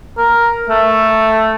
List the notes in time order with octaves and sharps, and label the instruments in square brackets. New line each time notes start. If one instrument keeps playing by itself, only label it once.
[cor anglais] A#4
A3